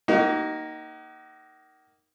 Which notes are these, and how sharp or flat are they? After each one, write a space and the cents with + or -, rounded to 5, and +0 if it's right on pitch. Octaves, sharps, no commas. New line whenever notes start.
A#3 +0 D#4 +0 F#4 +45